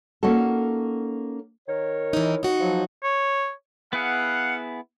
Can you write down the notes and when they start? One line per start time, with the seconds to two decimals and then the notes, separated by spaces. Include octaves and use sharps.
0.23 A#3 C#4 D#4 F#4 A4
1.67 D#3 A#4 C#5
2.13 E3 D#4
2.43 D#4 F#4
2.60 F3 F#3
3.03 C#5
3.93 B3 E4 G#4 F5 F#5